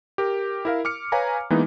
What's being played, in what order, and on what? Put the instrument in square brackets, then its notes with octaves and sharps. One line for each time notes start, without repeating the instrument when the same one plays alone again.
[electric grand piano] G4 A#4
E4 A#4 F5
D6 F6 C#7
B4 C#5 F5 G#5 A#5
E3 G#3 A#3 B3 D#4